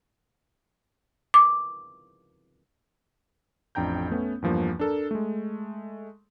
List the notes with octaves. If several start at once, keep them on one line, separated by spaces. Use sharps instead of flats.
D6
A1 F2 D4 G5 A#5 G6
A3 B3 C#4
E2 G2 F3 A#3
D4 A4 A#4
G#3 A3